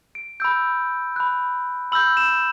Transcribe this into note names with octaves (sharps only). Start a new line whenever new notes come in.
D7
B5 E6 G6 D7
B5 F#6
B5 E6 G6 F#7
E7